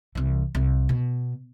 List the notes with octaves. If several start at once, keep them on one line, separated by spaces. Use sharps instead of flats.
C2 E3
C2
B2